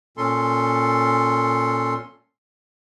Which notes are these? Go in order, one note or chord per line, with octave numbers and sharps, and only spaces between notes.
A#2 C#4 A4 C6